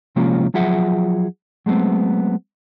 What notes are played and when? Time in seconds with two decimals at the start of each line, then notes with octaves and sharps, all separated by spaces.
0.16 C3 F3 G#3 A#3 C#4 F4
0.54 F3 F#3 F4 G#4 E5 F#5
1.66 F#3 G#3 A3 B3 C4